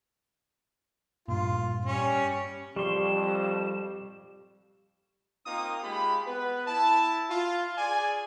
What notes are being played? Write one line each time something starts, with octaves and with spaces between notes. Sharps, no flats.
G2 A#2 F4
G3 C#4
F2 G3 G4 C6 C#6 E7
A#3 C4 D#4 F4 D#6
G#3 F4 G4 B5
B3 B4
E4 A5
F4
G#4 D5 G#5